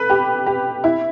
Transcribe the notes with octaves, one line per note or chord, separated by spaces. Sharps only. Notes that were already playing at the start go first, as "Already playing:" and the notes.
Already playing: A4 B4
G4
G4
E4